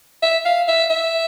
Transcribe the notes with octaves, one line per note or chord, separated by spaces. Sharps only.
E5
F5
E5
E5